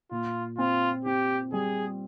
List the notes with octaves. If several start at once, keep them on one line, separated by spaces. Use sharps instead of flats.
A#2 F4
C4 F4
C4 G4
G3 G#4